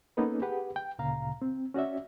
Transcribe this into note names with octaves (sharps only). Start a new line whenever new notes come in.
A#3 B3 C#4 D#4 A4 B4
G4 G#4 B4 F#5
G5
D2 A#2 C#3 F5 A#5
C4
C#4 F#4 D5 E5